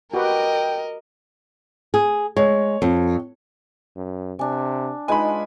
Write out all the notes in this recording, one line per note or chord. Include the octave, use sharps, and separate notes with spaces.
F#4 G4 A#4 B4 D#5 G5
G#4
G#3 C#5
F2
F#2
C3 D4 G#5
G#3 D#4 F4 B4 G#5 B5